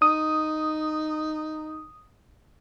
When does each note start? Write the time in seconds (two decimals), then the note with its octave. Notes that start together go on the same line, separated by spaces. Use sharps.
0.02 D#4 D#6